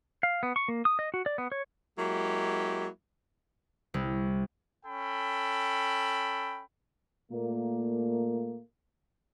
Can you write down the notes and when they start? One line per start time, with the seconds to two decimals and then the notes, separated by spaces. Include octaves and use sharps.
0.23 F5
0.43 B3
0.56 C#6
0.68 A#3
0.85 D#6
0.99 D#5
1.14 F#4
1.26 D5
1.38 B3
1.52 C#5
1.98 F#3 G#3 A#3 E4 G4
3.94 C2
4.86 C#4 A4 G5 B5
7.31 A#2 A3 A#3